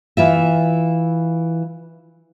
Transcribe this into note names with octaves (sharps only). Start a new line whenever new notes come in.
E3 F4 E5